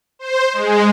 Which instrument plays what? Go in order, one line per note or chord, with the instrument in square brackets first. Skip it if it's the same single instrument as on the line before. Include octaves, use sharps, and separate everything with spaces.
[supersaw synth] C5
G#3